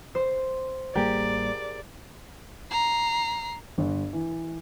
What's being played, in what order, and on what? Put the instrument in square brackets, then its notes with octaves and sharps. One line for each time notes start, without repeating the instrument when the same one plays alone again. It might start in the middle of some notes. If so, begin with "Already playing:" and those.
[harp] C5
[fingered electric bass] A1 G3 A#3 [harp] G4 G#4 A#4 [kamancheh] D5
[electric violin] A#5 C7
[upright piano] G1
E3